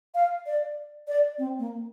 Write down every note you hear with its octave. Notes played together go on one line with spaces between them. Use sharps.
F5
D5
D5
C4
A#3